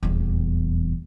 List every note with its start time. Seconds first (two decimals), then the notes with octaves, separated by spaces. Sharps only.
0.03 D#1 E2